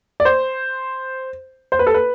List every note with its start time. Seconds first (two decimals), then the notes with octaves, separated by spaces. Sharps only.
0.20 D5
0.25 C5
1.72 C5
1.79 B4
1.87 A4
1.94 B4